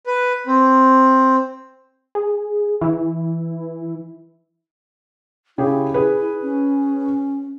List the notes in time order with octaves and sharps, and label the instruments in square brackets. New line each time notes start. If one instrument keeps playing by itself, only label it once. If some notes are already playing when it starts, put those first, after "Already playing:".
[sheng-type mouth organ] B4
C4
[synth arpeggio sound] G#4
E3 E4
[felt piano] C#3 G4 G#4 [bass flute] E4
[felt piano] G#4 B4
[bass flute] C#4